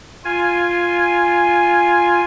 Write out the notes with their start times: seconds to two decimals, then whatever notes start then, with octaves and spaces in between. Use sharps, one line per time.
0.25 F4 G#5